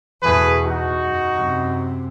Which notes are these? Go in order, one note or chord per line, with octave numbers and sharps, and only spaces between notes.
E2 B2 A3 G#4 B4
D#4 F#4
F#2
F#2 C3